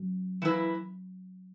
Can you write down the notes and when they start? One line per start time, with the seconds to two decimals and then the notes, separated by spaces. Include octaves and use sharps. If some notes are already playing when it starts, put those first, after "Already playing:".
Already playing: F#3
0.42 E3 A#3 E4 B4